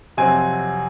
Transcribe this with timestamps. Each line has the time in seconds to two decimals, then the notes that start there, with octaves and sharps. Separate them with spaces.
0.17 F2 C3 F#3 C4 G#5